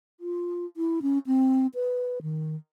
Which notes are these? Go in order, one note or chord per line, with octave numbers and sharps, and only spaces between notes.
F4
E4
C#4
C4
B4
D#3